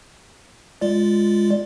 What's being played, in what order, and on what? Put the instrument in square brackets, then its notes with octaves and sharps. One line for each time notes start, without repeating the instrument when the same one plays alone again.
[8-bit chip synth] G#3 F4 D5